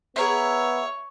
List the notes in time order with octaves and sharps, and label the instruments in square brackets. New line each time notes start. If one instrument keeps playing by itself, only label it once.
[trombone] B3 [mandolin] G#4 A#4 E5 [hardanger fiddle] C#5